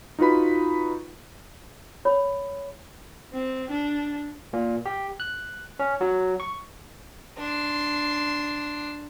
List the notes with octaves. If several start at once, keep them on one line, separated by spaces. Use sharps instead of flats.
D#4 F4 F#4 B4 B5
C#5 B5
C4
D4
A#2
G4
F#6
C#4
F#3
C#6
D4 C6